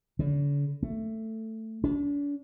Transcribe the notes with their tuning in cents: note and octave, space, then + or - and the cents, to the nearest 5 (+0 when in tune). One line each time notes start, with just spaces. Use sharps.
D3 -45
A3 +10
D4 -40